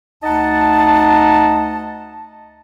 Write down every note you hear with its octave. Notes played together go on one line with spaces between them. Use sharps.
D2 D#4 D#5 F#5 A5